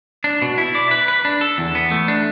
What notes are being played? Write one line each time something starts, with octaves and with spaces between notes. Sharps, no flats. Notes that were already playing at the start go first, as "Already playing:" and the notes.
D4
B2
E4
D5
B4
B4
D4
A4
E2
B3
A3
D4